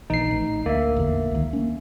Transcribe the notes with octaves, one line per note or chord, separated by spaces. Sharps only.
A#1 E3 D#4 C7
A1
D2 A#3 E5
A1 E2 D3
C#2 D#3
A#3 C#4